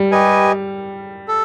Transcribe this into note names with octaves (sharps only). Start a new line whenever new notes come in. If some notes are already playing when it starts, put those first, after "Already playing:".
Already playing: G3
G4 B4 D#5 G#5
A4